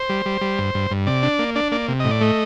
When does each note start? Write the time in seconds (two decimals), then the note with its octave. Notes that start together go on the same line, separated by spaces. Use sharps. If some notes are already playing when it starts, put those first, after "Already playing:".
Already playing: C5
0.09 G3
0.26 G3
0.41 G3
0.59 G2
0.75 G2
0.91 G2
1.07 C3 D5
1.23 D4
1.39 A#3
1.55 D4 D5
1.72 A#3 D5
1.88 C3
2.00 A2 D#5
2.11 D5
2.21 A3 D#5